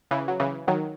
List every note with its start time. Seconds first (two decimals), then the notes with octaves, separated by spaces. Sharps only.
0.11 C#3 E3
0.28 F#3
0.40 C#3 E3
0.68 D#3 F#3